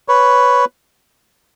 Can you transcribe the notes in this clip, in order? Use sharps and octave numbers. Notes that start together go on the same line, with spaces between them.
B4 C#5